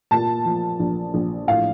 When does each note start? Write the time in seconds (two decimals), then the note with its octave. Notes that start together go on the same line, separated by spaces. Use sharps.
0.11 A#2 A5
0.46 F3
0.79 A#1
1.14 A#1
1.47 A2 F5